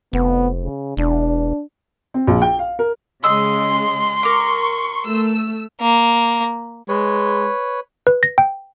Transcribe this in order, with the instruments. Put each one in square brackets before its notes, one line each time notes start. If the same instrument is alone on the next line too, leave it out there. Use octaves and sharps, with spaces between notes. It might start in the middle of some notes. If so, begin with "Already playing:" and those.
[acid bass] F1 [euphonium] B3
[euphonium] C#3
[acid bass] E1 [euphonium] D4
[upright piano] C4
A#1
G5
F5
A#4
[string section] C#3 G#3 [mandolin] D#5 E6 [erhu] C6
[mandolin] A#4 D6 [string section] C#6
[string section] A3 E6
[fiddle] A#3
[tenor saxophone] G#3 [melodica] B4 C#5
[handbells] B4
A#6
G5